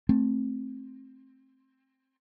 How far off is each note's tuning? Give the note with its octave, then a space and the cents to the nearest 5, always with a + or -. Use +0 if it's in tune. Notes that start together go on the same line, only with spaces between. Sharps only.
A3 +0 C4 +15